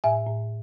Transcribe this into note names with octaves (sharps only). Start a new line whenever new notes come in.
A2 E5 G#5
A2